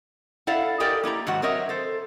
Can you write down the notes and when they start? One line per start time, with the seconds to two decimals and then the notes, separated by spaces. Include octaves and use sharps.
0.47 E4 A4 D5 F5 F#5
0.80 G4 A4 A#4 D5 D#5 G5
1.04 A#3 E4 G4 A#5
1.27 G#2 D#3 F#3 F#4 F#5
1.42 F#3 C4 A#4 C#5 D#5 E5
1.69 A4 C5